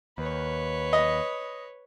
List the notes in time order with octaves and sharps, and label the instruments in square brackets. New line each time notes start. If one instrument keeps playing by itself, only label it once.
[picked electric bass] D#2 [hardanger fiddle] B4 C#5
[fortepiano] D#5